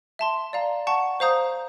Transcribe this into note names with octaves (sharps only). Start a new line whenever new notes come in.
E5 A5 C6
D5 F5 A#5
F#5 A5 C#6
C5 F5 A#5 D#6 G6